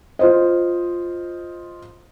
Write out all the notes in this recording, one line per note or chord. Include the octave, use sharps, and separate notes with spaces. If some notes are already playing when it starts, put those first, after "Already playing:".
F4 C5 D#5